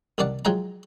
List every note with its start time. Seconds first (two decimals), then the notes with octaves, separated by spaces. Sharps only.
0.18 C2 D#3 D4 D5 F#5
0.45 F3 F#3 G#3 F#5 G5 A#5